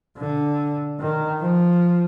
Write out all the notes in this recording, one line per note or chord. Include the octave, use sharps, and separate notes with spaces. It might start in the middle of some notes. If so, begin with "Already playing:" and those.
D3
D#3
F3